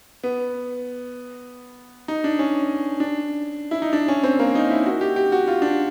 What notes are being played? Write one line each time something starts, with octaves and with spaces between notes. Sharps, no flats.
B3
D#4
D4
C#4
D4
E4
D#4
D4
C#4
C4
A#3
D#4
E4
F#4
G4
G4
F#4
F4
D4